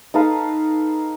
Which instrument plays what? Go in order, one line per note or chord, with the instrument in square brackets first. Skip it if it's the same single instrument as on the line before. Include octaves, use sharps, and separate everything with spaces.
[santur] D#4 A4 B4 F5